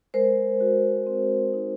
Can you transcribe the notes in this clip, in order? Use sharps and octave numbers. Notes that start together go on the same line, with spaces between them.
G#3 A#4 C5
F#4
C4
D#4